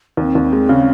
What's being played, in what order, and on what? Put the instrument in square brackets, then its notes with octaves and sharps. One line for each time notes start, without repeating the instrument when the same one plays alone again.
[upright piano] D#2 [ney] C4
[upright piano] D#2
G#3
C#3